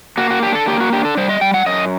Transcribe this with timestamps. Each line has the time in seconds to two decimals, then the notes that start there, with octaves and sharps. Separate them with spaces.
0.17 A#3 F#4
0.30 F#4
0.43 D4 G4
0.55 A4
0.67 A#3 G4
0.80 F#4
0.93 D4 G4
1.05 A4
1.17 G3 C5
1.29 D#5
1.41 G3 G5
1.54 F#5
1.66 F#2 D#5